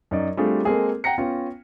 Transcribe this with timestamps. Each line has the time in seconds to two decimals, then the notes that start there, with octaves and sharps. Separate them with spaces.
0.11 F#2 D#4 D5
0.37 G3 A3 C4 D4 F4 G#4
0.64 G#3 A#3 C4 G#4 A4
1.04 F#5 G5 A#5 A#6 C#7
1.18 B3 C#4 F4 G5